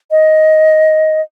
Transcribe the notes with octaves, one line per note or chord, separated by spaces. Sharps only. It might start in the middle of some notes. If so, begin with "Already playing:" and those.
D#5